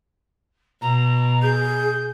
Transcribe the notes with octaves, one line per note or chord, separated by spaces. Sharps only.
B2 A#5
G#4 G6